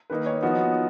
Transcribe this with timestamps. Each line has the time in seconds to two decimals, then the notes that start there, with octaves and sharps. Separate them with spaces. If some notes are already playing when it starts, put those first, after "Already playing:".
0.10 D#3 A#3 D#4 B4
0.26 C#5
0.42 F3 B3 D#4 F#4